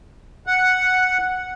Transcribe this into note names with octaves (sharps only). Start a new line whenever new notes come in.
F#5